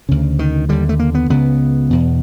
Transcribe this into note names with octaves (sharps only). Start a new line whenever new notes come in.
D2 C#3
D#3
D#2 D3 G3
A3
A#3
B3
C#2 C#3 B3
E2 B2